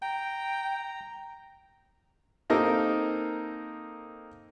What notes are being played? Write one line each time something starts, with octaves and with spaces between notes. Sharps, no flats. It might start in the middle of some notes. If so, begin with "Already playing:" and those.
G5 A#5
A#3 C4 D#4 A4 A#4